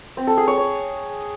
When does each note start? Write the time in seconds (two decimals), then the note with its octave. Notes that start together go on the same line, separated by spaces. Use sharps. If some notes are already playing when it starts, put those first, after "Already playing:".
0.17 C4
0.27 A4
0.37 G#4
0.47 C#5
0.58 C#5